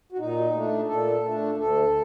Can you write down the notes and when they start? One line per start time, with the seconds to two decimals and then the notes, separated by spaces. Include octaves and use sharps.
0.12 F#4
0.18 A#2 D#4
0.54 A3 D4
0.87 A#2 A4
1.23 A3 D4
1.57 D2 A4